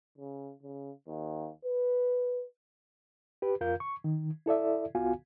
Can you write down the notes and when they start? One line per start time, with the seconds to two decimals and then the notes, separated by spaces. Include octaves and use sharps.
0.18 C#3
0.63 C#3
1.07 D#2
1.65 B4
3.42 G4 B4
3.61 F2 F4 A#4 F5 G6
3.80 C#6
4.04 D#3
4.46 E4 A4 D5 E5
4.95 C2 B3 F4 F#4 F5 G#5